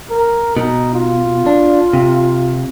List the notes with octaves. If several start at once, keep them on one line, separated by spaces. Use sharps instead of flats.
A#4
B2 D#4
F4
D4
C3